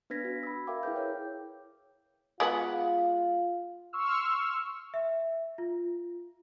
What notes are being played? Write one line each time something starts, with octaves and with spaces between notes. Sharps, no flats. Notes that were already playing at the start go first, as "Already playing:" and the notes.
B3 D4 B4 G#6 A#6 B6
F#4
B5 E6
A#4 E5 F5 G5 D6
E4 G#4 B4 G6
A#4 C#5 G5
G#3 B3 F4 F#4
C6 C#6 E6 F6
E5
F4